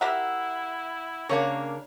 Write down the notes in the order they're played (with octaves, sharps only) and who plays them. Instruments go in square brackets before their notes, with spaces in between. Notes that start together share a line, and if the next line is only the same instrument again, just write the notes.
[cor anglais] E4 [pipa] G4 A#4 E5 [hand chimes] F#5
[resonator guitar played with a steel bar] C#3 A#3 D4 [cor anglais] A#4 [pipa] C#5